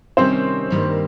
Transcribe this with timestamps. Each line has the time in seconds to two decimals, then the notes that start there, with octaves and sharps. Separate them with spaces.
0.17 C3 D#3 G3 C4 C#4 C5
0.70 G2 D#3 G3 A#3 D#4